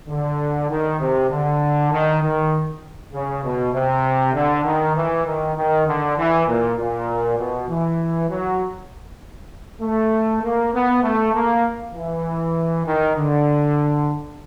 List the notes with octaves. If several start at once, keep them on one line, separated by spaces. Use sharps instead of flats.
D3
D#3
C3
D3
D#3
D#3
C#3
B2
C3
D3
D#3
E3
D#3
D#3
D3
E3
A#2
A#2
B2
E3
F#3
A3
A#3
B3
A3
A#3
E3
D#3
D3